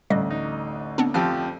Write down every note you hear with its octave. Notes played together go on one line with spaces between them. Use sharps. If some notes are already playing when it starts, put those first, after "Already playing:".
A1 D2 G3 D#5
D#4
B3 C4 D4
F2 F3 G4 F6